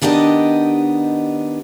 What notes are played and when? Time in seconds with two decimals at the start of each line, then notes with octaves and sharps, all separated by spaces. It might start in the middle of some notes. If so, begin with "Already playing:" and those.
0.02 D#3 B3 D4 G4 D#5